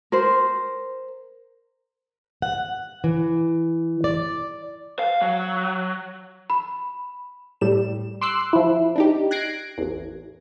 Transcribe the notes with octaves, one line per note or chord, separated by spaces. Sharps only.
A#4 C5
F#5
E3
D5
F5
F#3
B5
A2 G3 E7
C6 D6 E6 F#6 C7
F3 E4
D4 D#4 G4
F#6 G#6 A#6 C7 D7
A1 E2